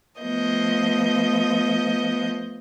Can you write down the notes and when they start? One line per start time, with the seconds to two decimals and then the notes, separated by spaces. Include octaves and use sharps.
0.21 F3 A3 B3 D#5 G6